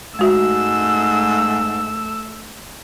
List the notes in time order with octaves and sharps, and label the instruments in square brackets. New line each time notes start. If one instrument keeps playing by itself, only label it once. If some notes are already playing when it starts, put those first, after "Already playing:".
[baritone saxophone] G#2 [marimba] G#3 F#4 E5 [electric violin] A3 E6